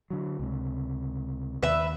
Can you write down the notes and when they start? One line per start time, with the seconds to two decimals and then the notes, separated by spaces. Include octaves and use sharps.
0.10 D3 F#3
0.39 C#2 C3
1.62 D#2 B4 E5